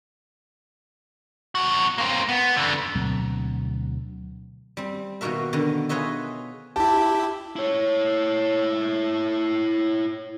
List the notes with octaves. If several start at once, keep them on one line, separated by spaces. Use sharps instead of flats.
E2 F#4
A#3 C4
B3
F2 D3
D2 B2 F#3 C4
G3 C4
B2 D#3 A#3 F#4 A#4 E5
D3 D#3 B3
F4 G#4 B4 C#5 D#5 E5
E4 G4 A5
E4 C#5